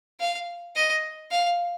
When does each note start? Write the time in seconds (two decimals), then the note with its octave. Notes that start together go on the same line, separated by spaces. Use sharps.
0.20 F5
0.75 D#5
1.31 F5